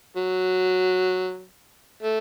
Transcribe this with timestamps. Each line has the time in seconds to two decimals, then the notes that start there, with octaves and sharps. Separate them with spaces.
0.16 F#3
2.02 A3